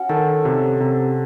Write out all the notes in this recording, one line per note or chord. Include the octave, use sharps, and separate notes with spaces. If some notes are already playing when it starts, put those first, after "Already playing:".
Already playing: C#4 F#4
D#3 A4
C3
C3